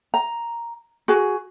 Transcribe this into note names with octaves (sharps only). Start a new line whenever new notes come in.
A#5
F#4 G#4